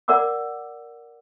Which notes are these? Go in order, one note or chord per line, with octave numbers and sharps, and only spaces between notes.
A#4 D5 F#5 D6 E6